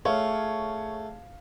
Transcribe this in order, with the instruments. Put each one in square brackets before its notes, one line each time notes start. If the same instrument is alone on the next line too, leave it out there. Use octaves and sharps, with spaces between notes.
[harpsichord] A3 [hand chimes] G#4 A5 [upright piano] C#5 [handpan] F5